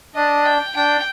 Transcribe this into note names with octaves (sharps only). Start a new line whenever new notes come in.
D4 D#5
G5
D4 G5